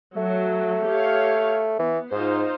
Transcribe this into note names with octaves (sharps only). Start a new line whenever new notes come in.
F#3 A3
G4 C#5 F5
E3 B3
G#2 D#4 F4 C5